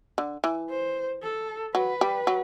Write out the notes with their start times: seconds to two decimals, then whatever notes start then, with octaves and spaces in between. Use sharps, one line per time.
0.18 D3
0.44 E3
0.70 C5
1.23 A4
1.75 F#3 B4
2.01 G3
2.27 F#3